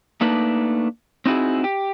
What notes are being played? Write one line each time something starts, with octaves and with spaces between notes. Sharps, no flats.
A3 A#3 D4 D#4 B4
C4 D#4 E4 F#4 G#4
G4